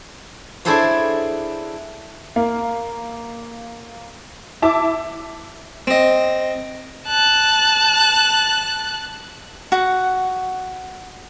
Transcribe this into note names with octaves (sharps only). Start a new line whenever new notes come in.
D4 E4 G#4 A4 C5 C#5
A#3
E4 E5 A5 D6
C4 D#5
A5 F#6
F#4 F#5